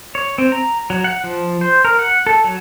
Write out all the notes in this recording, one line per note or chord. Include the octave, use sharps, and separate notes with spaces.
C#5
C4
A#5
F#3
F#5
F3
C5
A#4
F#5
A4
F#3